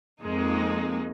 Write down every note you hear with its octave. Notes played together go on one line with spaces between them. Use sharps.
F2 G#3 A#3 D#4